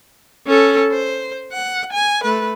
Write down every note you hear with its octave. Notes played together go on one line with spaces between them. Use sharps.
C#4 A4
C5
F#5
G#5
A3 B4